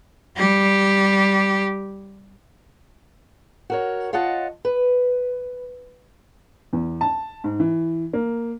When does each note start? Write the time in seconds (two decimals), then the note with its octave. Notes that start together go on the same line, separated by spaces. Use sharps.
0.37 G3 G4
3.70 F#4 A#4 C#5
4.13 F4 C#5 D#5 F#5 A5
4.65 B4
6.73 E2
7.01 A5
7.44 G#2
7.60 E3
8.13 A#3